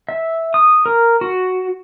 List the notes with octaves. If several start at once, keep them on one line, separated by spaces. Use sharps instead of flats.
E5
D#6
A#4
F#4